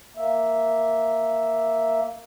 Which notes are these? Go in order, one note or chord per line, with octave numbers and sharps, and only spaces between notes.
A#3 E5